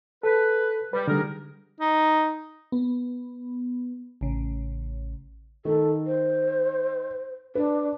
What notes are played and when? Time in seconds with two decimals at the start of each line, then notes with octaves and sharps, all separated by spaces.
0.23 A4 B4
0.93 G3 B4
1.08 D3 G3 D#4 G#4 A#4
1.80 D#4
2.72 B3
4.21 A1 C#3
5.65 D#3 A4
6.06 C5
7.55 D4 B4